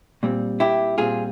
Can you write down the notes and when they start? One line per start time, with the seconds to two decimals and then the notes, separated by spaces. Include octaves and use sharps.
0.23 A#2 G3 C4
0.60 E4 G4
0.98 A#2 G3 C4 F4 G#4